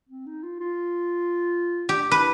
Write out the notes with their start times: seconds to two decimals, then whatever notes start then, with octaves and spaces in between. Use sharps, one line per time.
0.09 C4
0.26 D#4
0.43 F4
0.60 F4
1.89 G4
2.11 E4 B4